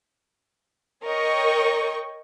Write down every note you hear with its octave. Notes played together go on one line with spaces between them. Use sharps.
A#4 C#5 D#5 G5 C#6